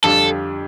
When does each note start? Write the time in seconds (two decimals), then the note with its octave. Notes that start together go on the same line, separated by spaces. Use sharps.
0.04 F2 D3 G3 D4 F4 A4